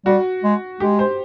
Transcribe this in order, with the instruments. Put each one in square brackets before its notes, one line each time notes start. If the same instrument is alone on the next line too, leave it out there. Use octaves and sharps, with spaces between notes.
[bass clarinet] G3 [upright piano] F#4
[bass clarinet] G#3
[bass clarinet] G#3 [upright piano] G4
[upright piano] C5